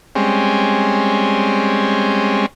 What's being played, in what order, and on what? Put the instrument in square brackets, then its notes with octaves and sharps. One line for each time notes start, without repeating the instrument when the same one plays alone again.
[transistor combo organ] G3 G#3 C4 C#4